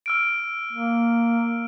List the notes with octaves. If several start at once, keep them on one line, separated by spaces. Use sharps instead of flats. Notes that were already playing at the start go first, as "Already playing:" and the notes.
E6 F6 D7
A#3